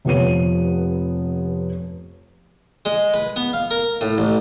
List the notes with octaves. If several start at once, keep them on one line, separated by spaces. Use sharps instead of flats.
F1 F3 B3 C#5 D#7
G#3
B4
B3
F5
A#4
A2
A1